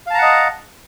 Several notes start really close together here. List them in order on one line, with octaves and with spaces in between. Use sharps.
F5 A5 A#5 F#5 D#5